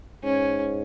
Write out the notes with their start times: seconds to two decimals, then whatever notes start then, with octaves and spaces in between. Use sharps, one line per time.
0.23 G#2 C#4